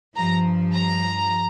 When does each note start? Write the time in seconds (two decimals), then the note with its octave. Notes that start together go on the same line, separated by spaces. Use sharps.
0.17 G2 F3 A#5
0.74 A#5